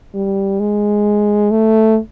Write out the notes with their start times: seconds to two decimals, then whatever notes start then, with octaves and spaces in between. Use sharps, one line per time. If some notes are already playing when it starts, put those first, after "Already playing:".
0.14 G3
0.60 G#3
1.51 A3